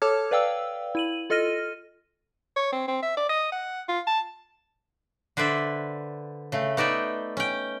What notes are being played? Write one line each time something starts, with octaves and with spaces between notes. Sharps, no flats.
A4 C#5 A5 D6 F6 G#6
B4 D5 F5 G5 E6
E4 D#7 F#7
F4 A4 D#5 F6 A#6 D#7
C#5
C4
C4
E5
D5
D#5
F#5
F4
A5
D3 B4 C5 D5 E5
C#3 A3
B3 D#4 D5 E5 G5
C#4 G5